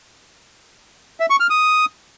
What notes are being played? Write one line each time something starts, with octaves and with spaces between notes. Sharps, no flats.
E5
C#6
F6
D#6